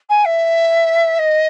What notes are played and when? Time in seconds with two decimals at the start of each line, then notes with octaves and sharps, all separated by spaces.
0.09 G#5
0.25 E5
1.19 D#5